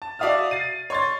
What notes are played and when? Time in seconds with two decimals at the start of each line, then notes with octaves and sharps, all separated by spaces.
0.02 A5
0.19 F#4 D5 E5 F5 D#6 F6
0.51 A6 C7 D#7
0.90 C#5 C6 A6